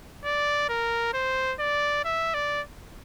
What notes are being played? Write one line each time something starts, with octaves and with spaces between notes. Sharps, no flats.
D5
A#4
C5
D5
E5
D5